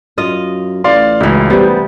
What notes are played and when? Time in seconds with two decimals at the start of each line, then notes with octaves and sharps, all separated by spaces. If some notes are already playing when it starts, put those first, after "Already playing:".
0.18 F#2 F4 D#5
0.84 A1 D5 F5 C6
1.20 C#2 B2 E3
1.50 C3 G3 B3 C5